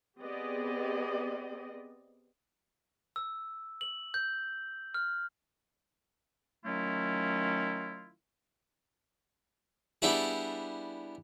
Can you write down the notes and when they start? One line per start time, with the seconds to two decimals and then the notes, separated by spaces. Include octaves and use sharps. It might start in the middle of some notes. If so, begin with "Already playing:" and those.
0.20 B3 C4 G4 G#4 D5 D#5
3.16 E6
3.81 F#7
4.14 G6
4.94 F6
6.65 D#3 F#3 A3 C#4 E4 F4
10.02 G3 B3 D4 E4 G#4